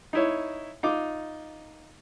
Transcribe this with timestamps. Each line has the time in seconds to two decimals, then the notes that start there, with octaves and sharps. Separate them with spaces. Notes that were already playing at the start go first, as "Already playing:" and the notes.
0.13 D#4 E4 C#5
0.83 D#4 F4 D6